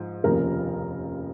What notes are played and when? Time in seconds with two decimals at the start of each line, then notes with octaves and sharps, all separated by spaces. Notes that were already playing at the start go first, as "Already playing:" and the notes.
Already playing: G#2 F3
0.24 F1 D#2 C#3 F3 A#4